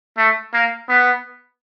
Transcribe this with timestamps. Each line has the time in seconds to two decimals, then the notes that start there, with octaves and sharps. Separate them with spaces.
0.17 A3
0.53 A#3
0.89 B3